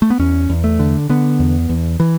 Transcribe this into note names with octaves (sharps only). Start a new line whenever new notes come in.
A3
B3
E2 C#4
E2
A3
D3
D3 B3
E2
E2
E3